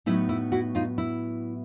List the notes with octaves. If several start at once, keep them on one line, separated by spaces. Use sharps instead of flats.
A2 F#3 B3 D#4 E4
E4
E4 F#4
D#4 F4
E4